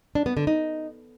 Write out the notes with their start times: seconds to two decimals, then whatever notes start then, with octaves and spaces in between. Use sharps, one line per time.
0.15 D4
0.26 B3
0.37 D3
0.47 D#4